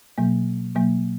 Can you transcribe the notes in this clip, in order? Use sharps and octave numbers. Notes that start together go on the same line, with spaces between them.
B2 F#3 A#3
B2 F#3 A#3